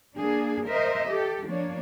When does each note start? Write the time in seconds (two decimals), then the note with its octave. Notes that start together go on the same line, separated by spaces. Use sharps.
0.15 A#3 D4 G#4
0.66 A#4 C5 D#5 E5
1.08 G4 A4
1.48 F3 A#3 D4 C#5